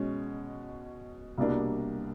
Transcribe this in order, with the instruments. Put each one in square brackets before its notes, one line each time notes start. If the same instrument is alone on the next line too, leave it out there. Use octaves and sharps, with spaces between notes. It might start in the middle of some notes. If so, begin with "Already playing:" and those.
Already playing: [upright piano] B2 G#3 C#4
C2 B2 G3 A#3 D4